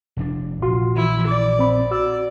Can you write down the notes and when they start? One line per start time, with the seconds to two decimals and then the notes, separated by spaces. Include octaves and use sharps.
0.17 F1 A#2 D4
0.62 A#1 F4 F#4 C6
0.96 E3 E4
1.27 D5
1.59 C4 B5
1.91 F#4 D5 E6